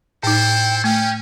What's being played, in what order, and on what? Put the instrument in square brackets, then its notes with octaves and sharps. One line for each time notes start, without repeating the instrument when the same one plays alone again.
[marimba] A2 D#4 [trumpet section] E4 A4 C5 [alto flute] G5
[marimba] A3 [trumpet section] C#4 [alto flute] G5